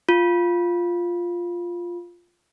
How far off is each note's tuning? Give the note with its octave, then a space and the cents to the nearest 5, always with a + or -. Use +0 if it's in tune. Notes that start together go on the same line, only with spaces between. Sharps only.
F4 +0